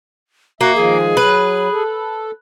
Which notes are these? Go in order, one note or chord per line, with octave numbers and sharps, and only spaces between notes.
A#3 F#4 E5
D#3 F3 G#3 G#4
F#3 B4
A4